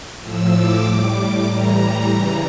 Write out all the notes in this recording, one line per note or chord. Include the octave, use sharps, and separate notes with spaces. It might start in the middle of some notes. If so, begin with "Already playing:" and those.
A2 F3 E6
D6
A2 G3 D6
A2 E3 G3 A#5
C#3 E3 G3 A#5